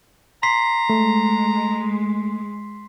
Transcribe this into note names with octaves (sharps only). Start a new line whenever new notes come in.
A#5 C6 B6 C7
G#3 A3